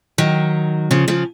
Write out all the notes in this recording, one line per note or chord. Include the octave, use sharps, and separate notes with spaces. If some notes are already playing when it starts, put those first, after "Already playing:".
D#3 F#3
C#3 F3
C#3 F3